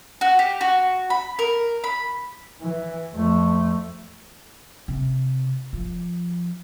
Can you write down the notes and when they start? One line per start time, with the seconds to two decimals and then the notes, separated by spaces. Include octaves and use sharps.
0.21 F#4
0.39 G4
0.61 F#4
1.10 B5
1.39 A#4
1.84 B5
2.61 E3
3.14 F2 A3
4.88 C3
5.73 F3